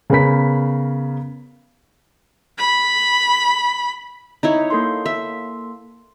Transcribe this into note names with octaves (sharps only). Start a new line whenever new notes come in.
C#3 B3 A#4 B5 B6
B5
D#4 E4 C#5
A#3 A4 C6
E5